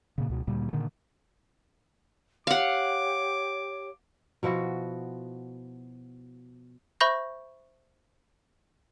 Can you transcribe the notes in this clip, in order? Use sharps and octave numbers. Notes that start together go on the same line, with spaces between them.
A#2 C#3
C#2 B2
D2 A#2 G3
A#2 D3 D#3
G4 C#5 F5 F#5 D6
B2 F3 E4 F#4
C5 E5 B5 C#6 G6 A#6